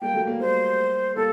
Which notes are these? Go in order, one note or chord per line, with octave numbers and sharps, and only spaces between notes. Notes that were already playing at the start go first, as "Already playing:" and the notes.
G3 A#3 G5
F#3 A3
G3 A#3
G3 A#3 C5
G3 A#3 A4